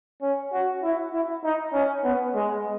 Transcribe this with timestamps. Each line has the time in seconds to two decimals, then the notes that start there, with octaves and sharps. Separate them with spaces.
0.22 C#4
0.52 F#4
0.83 E4
1.13 E4
1.44 D#4
1.73 C#4
2.04 B3
2.35 G#3